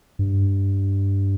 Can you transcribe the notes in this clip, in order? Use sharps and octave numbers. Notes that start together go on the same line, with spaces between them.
G2